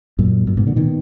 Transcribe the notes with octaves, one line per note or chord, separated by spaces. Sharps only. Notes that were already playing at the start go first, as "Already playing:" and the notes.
F#2 A#2
F#2 A#2
G#2 B2
A#2 D3
B2 D#3